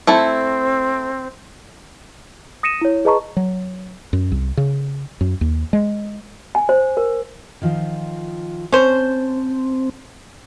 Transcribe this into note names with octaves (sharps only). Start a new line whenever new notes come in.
A3 C4 E4 A4
D#6 A#6 C#7 D#7 E7
E4 C#5
G#4 B4 D#5 A5 A#5 C#6
F#3
F#2
C2
C#3
F#2
D#2
G#3
G#5
C5
A#4
D#3 F3 F4
C4 C#4 C5 A5